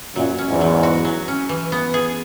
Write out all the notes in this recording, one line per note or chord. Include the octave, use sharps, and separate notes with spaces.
F#2 A#2 F#3
C#4
E2 G#2
F#3
F#4
F#3
C#4
E3
B3
G#4